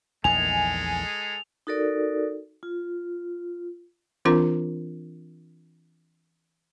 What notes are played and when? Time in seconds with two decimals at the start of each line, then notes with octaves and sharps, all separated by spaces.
0.24 A#1 E2 D#3 G#3 G#4 A4 G#5 F7
1.67 D#4 F#4 A4 A#4 D5
2.63 F4
4.25 E3 C4 D4 F4 A#4